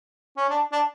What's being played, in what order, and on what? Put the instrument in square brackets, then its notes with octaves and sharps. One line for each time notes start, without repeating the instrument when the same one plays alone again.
[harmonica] C#4
D4
D4